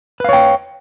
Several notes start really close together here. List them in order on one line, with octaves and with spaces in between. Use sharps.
B4 F5 C#5 G5